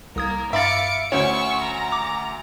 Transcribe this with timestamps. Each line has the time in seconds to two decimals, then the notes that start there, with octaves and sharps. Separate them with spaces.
0.16 C2 A#3 A#4 D#6 G#6
0.53 G2 E5 F5 B5 D6 A6 C#7
1.12 D2 C#4 C5 C#5 C#6 E6
1.62 A#5
1.92 D6